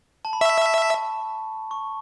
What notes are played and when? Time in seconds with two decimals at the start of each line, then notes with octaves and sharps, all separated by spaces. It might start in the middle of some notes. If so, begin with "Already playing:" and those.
0.25 A5
0.33 B5
0.41 E5 C#6
0.63 A5
0.85 A5
1.71 C#6